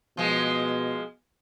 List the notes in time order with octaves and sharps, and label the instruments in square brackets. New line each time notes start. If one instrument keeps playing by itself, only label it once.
[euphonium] B2 [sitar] F3 G#3